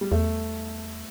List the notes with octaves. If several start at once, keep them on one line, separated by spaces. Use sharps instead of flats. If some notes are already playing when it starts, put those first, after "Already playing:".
G3
E2 A3